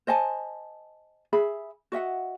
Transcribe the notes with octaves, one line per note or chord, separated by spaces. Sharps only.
C5 D#5 G#5 A5
G#4 E5 B5
F#4 D#5 E5 F#5